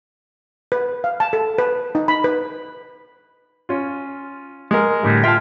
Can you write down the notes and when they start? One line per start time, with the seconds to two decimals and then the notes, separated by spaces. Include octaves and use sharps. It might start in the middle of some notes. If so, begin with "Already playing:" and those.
0.72 B4
1.04 F5
1.20 A5
1.33 A4
1.58 B4
1.95 D#4
2.08 B5
2.24 B4
3.69 C#4 F4
4.71 G#3 A#4
5.03 A2 D3 G3
5.24 F4 E5 G5 A5